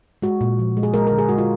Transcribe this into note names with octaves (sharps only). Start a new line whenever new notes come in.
G#3 F#4
A#2
F3
G#3
G#4
G#3 A#4
D3 A#4
G#4
G#3 F#4
F4